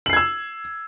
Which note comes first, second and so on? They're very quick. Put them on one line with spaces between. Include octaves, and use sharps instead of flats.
F#7 C7 G#6 E6